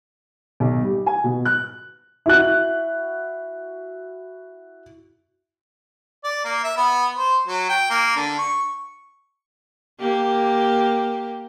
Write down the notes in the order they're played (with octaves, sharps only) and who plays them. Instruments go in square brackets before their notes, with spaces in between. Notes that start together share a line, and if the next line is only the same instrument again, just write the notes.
[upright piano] B1
G3
G#5
B2
F#6
E4 F#4 F#6
[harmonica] D5
A#3
E5
B3
C5
F#3
G5
A#3
D3
C#6
[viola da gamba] A#3 G4